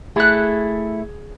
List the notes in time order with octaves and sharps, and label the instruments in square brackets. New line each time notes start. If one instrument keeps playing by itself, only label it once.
[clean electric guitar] A3 E4 [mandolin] G#4 F#6